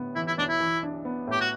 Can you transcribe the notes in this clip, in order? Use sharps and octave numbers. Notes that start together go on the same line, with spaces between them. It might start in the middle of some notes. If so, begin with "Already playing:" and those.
Already playing: A2 D3 B3
E3 E4
E4
B1 D4
E4
E3
D4
B3
A2 G4
F#4